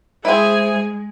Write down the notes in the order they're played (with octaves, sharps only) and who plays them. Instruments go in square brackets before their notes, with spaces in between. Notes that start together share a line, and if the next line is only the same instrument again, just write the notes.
[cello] G#3 [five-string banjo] C4 E4 [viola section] G#4 G#5